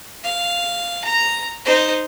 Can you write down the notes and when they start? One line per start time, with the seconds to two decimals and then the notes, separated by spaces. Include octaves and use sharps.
0.24 F5
1.05 A#5
1.65 D#4 C5